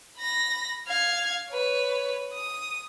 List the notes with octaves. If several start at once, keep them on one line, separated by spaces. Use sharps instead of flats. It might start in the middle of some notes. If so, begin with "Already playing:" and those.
B5 A#6
F5 G#6
B4 C#5
D#6